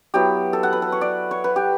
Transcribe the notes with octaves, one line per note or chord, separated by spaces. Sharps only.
F#3 B3 E4 G4
A4
F#5
B4
A4
C#5
D5
C#5
B4
G4